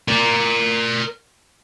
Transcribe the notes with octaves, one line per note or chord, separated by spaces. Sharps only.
A#4 D5